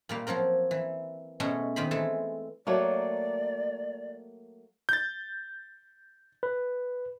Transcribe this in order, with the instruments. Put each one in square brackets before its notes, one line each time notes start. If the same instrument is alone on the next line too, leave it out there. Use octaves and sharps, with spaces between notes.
[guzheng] A#2 G3 A#3
F3 F#3 C4 A#4
E3
B2 G#3 A3 C#4 F#4
A#2 D#3 C4 C5 D#5 B5
E3 G#3 A3 A4
[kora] F#3 A3 A#3 [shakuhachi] D5
[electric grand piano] G6 A6
[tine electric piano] B4